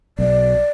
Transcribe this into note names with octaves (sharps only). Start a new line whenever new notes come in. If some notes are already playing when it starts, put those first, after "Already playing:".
B1 D5